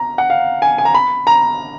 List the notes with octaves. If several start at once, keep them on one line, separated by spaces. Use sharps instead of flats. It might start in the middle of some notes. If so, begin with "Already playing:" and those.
Already playing: A#5
F#5
F5
G#5
G#5
A#5
B5
A#5